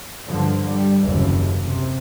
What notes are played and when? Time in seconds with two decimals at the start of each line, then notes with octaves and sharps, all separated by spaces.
0.25 G2 D3 F3
0.68 G3
1.01 F#1 D#2 C3 E3
1.65 C3